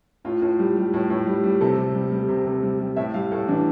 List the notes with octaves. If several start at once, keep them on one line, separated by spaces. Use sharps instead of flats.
A2 F4
A2
G3
G3
A2
A2
G3
G3
C3 A4
C3
G3
G3
C3
C3
G3
G3
A2 E5
G3 F5
A2 A4
E3 D4